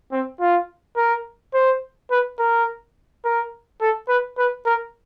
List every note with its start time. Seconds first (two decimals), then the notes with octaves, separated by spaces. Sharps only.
0.12 C4
0.40 F4
0.97 A#4
1.54 C5
2.11 B4
2.39 A#4
3.25 A#4
3.81 A4
4.09 B4
4.38 B4
4.66 A#4